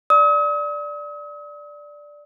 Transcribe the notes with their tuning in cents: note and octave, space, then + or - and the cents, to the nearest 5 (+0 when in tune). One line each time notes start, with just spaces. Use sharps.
D5 +0 D#6 +45